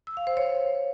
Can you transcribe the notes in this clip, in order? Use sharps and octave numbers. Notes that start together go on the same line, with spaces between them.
E6
F5
C5
C#5